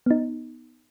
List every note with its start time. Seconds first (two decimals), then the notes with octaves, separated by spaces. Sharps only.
0.06 B3 D#4